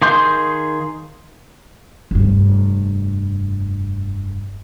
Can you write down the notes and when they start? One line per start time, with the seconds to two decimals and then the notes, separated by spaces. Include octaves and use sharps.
0.02 D#3 G#4 F5 C6 G6
2.11 F1 G2